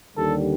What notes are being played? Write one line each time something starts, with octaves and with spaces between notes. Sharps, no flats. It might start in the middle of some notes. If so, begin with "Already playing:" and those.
D#2 D3 G3 A4